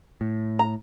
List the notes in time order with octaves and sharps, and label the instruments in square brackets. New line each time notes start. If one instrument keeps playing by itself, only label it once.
[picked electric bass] A2
[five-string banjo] A#5